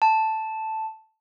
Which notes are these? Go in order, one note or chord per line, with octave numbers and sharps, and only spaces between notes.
A5